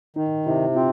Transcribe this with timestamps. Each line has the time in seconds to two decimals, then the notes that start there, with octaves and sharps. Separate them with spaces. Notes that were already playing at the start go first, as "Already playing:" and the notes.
0.16 D#3 D#4
0.46 C3 E4
0.75 C4 F4